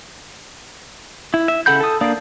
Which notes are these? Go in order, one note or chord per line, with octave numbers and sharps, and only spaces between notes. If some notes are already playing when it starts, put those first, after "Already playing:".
E4
E5
C#3 A4 F#5 B5 G6
A4 D#6
A#3 D4 D5 F5 D#6